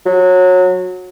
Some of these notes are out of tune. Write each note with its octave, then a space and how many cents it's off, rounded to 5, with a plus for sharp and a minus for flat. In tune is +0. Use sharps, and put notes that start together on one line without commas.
F#3 -20